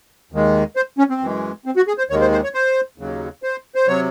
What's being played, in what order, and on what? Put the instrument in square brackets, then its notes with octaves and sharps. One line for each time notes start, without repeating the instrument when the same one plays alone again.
[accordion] D#2 D#3 G#3
C5
C#4
C4
F#2 E3 G#3
C4
F#4
G#4
C5
D#2 D#3 G#3 C#5
C5
C5
C#5
C5
D#2 C#3 F#3
C5
C5
C3 F#3 C#5